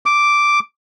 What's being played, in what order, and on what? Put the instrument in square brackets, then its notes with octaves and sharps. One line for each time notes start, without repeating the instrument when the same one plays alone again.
[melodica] D6